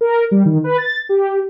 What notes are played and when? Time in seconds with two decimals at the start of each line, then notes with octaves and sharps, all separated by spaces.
0.01 A#4
0.31 G3
0.45 D#3
0.64 B4
0.78 A6
1.09 G4